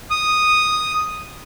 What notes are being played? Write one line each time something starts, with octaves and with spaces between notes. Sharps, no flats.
D#6